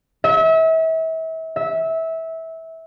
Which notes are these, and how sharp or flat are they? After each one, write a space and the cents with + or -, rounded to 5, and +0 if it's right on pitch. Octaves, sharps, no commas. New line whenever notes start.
E5 -35
E5 -20